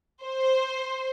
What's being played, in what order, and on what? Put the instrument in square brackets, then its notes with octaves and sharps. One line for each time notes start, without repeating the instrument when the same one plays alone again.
[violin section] C5